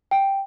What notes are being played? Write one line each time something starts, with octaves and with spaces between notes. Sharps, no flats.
G5